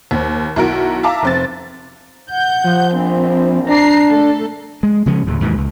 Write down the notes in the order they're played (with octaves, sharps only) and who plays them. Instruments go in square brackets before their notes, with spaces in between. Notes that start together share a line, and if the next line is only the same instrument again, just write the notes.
[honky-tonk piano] D#2 C5
B1 E4 F#4 A#4 D7
E5 F5 A5 A#5 D6
F1 C4 A6
[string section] F#5 G6
[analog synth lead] F3
[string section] A#1 C4
[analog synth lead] D4 [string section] A#5 C7
[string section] A3 A4
[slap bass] G#3
C#3 F3 G#3 C#4
D2 A2 C#3
D#2 G#2 B2 E3
C#2